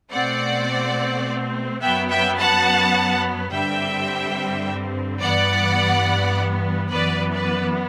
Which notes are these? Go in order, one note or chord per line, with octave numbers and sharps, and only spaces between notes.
B2 A3 C4 D5 F#5
F#2 F#3 B3 E5 G5
E5 G5
F#5 A5
G2 D3 G3 C4 E5 G5
G2 E3 B3 D5 F#5
F#2 E3 B3 B4 D5
B4 D5